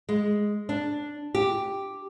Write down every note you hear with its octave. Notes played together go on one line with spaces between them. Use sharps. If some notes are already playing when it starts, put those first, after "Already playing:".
G#3
D4
G4